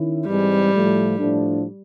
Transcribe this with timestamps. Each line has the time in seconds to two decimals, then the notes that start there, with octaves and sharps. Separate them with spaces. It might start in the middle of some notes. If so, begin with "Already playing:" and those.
Already playing: D#3 C#4 E4
0.26 G#2 E3 G3 G#3 C4
0.73 A2 F3 A3
1.18 A2 F3 A3 D4